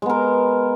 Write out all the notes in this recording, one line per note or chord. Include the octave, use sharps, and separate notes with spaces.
G#3 B3 A#4